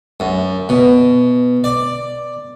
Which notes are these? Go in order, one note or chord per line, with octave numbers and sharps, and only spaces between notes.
F#2
B2
D5